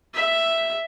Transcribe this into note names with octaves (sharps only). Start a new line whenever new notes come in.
E5